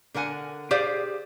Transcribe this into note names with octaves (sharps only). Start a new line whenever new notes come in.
D3 A#4 F#5 G#5
G4 G#4 C5 D5 F5